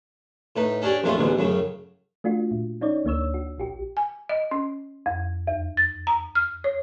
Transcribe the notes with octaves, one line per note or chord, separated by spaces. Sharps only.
A2 D#4 B4
C#4 D4 G4 G#4 D5
A#1 F2 G#3 A3 C#4 F4
A1 D2 G#2 B2
F#2 A2 C#3
A3 D4 F4 F#4
A#2
C#4 D#4 C#5 D5
D2 A#3 D4 C#5 E6
F#4
A#1 F#4 G4
G#5
D#5
C#4
F2
E2
A6
A#5
F6
C#5